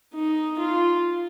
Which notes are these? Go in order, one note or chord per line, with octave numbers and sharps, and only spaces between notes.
D#4
F4